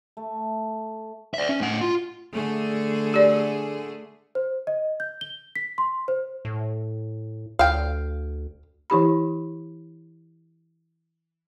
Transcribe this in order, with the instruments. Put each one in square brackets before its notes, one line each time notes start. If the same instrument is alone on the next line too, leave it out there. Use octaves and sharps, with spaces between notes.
[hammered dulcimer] A3
[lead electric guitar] D5 E5
C#4
A2 F#5
F4
[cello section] D3 A3 G#4
[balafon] G4 D5
[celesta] C5
D#5
G6
G7
B6
C6
C5
[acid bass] A2
[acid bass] D2 [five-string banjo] F5 G5
[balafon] E3 E4 G4 B5